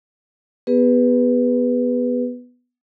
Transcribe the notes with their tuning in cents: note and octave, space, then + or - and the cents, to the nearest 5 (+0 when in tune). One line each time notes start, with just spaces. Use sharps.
B3 +0 G#4 -40 B4 +0